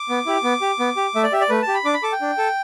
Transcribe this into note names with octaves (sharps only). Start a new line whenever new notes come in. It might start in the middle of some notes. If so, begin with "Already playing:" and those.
Already playing: D6
B3
E4 G4
B3
G4
B3
G4
A3 E5
D5
G4 E5
D5
A3 B4
A5
G4
B5
D4 D6
B5
A4 D6
G5
D4
A4